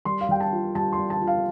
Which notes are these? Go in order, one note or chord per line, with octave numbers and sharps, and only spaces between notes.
G3 C6
F5
G3 G5
A5
F4
G3 A5
C6
G3
A5
F4
F5